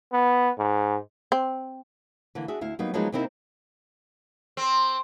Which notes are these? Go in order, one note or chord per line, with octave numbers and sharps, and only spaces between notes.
B3
G#2
C4
D3 E3 A#3
D4 F#4 G#4 E5
D2 E4 F5
F#3 G3 A#3 B3 D#4
F3 F#3 G#3 A#3 B3 D#4
C3 A#3 C4 D#4 E4 A#4
C4